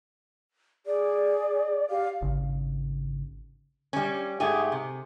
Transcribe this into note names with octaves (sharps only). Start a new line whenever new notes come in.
G#4 D5
G4 F5
G#1 C#3
G3 C#4
G#2 A3 G4 G#4
C3